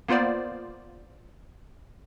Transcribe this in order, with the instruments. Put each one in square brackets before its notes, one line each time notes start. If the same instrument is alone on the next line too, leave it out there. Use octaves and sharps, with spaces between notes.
[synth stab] A#3 B3 F4 C5 D5